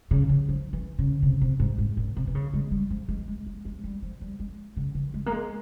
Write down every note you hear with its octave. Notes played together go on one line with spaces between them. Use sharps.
C#3
E3
F3
E3
C#3
C3
C3
G#2
G#2
A#2
C3
E3
C#3
G#3
G3
F3
G#3
G#3
G#3
G#3
G3
F3
G3
G#3
C#3
E3
G#3
A#3
G#3